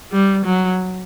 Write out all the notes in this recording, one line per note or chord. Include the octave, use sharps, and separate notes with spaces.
G3
F#3